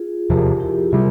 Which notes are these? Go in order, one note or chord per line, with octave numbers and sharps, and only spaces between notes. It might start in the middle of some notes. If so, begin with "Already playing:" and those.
Already playing: F4 G#4
E2 C3 F3 G4 A#4
E4 G4
C3 G3 F4 G#4